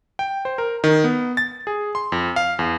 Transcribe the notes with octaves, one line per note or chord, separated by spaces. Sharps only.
G5
C5
A#4
D#3
B3
A6
G#4
C6
F2
F5
E2